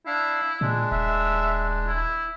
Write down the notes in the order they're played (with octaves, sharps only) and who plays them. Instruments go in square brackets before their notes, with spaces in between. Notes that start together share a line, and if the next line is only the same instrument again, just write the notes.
[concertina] D4 F5 [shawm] E4
[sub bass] A#2 [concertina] G#3 D4
[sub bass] D#1 [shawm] E5
[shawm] E4